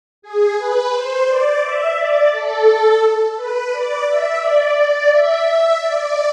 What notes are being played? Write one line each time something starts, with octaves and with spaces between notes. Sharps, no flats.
G#4
B4
C5
D5
E5
D5
A4
B4
D5
E5
D5
D5
E5
E5
D5